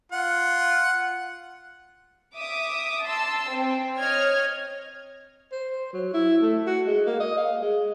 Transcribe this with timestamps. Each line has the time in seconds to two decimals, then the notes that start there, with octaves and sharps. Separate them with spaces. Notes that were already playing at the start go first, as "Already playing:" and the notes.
0.12 F4 F#5
2.36 E5 D6 D#6
3.06 A5 C6 E6
3.51 C4
3.98 C#5 D#5 F6 G#6
5.52 C5
5.93 F#3
6.14 E4
6.42 A3
6.67 F#4
6.86 G#3
7.06 A#3
7.20 D#5
7.37 F5
7.61 G#3